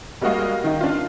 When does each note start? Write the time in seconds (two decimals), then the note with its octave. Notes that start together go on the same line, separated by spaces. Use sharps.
0.21 G3 G#3 A#3 F#4 D#5 F5
0.64 D#3 D#4
0.81 D4 F4